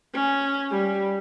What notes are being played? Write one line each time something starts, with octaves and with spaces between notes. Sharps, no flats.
C#4
G3